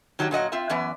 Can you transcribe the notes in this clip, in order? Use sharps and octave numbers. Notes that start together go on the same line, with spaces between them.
D#3 F#3 D4 E4 G4
A#2 F#3 D#5 F#5
C4 F4 E5
F#2 E3 B3 D5